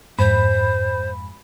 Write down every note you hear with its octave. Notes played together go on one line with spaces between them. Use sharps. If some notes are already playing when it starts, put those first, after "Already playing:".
F2 G#2 C5 B5